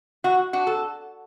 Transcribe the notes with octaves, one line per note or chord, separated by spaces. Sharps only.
E3 F#4
D4 F#4
A4